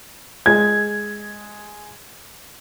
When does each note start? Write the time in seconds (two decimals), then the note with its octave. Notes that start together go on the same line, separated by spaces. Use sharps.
0.46 G#3 G#6